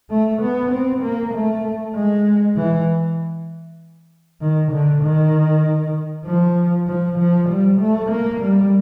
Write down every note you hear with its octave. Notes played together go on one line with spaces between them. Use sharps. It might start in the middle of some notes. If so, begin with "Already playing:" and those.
A3
B3
C4
A#3
A3
G#3
E3
D#3
D3
D#3
F3
F3
F3
G3
A3
A#3
G3